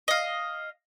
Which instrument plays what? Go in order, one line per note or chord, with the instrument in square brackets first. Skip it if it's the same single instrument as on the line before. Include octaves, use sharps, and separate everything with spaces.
[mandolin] D#5 F5